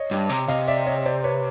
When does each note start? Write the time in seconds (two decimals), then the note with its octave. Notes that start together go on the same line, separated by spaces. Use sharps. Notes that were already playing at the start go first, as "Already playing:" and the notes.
Already playing: C#5 D#5
0.11 G2
0.30 C3
0.48 C3 D#5 F5
0.68 D5 E5
0.86 C#5 D#5
1.05 C5 D5
1.24 B4 C#5